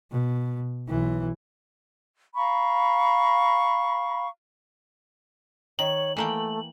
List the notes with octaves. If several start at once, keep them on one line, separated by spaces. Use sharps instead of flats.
B2
B1 E3
F5 A#5 B5 C#6
D#3 C#5 F#7
E3 A3 A#3 G5